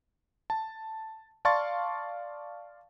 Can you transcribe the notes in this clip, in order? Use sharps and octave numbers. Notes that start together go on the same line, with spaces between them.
A5
D5 F5 A5 C6 C#6 A6